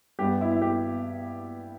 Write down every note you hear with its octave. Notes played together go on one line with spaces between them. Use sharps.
G2 G3 B3 G4
E4
E4
G4